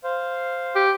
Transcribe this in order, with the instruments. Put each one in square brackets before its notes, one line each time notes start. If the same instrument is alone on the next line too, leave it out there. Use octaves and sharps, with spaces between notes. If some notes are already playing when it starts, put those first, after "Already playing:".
[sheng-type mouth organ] C5 F5
[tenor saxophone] G4